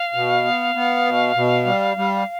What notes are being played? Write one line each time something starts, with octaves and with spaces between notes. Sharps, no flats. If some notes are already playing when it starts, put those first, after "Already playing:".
Already playing: F5
B2
B3
B3
B2
B2
G3
G3